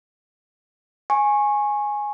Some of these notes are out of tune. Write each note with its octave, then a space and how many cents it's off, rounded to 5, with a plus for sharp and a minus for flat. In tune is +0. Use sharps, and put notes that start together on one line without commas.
G#5 +0 C#6 -25